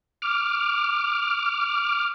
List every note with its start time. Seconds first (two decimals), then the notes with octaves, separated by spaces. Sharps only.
0.22 D6 F6